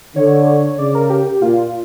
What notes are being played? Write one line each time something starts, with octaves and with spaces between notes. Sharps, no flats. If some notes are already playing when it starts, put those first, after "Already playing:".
D3 C#5
C#3 D5
A#4
G4
G4
A#2 F4